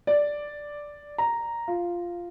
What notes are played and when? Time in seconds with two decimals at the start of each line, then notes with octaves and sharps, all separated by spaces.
0.07 D5
1.18 A#5
1.68 F4